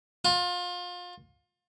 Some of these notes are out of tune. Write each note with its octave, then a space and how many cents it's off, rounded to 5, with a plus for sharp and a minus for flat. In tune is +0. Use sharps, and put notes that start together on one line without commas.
F4 +30